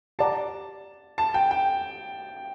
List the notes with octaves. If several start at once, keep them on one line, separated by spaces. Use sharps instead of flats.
G4 D5 F#5 A5 A#5
A5
G5
G5